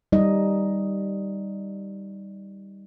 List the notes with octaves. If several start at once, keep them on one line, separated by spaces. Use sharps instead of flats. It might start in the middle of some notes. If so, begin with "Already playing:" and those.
G3 D#4 D#5